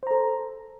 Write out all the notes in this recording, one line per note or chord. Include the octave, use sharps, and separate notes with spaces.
A4 C5 A#5